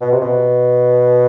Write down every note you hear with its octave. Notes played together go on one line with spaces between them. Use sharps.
B2
C3
B2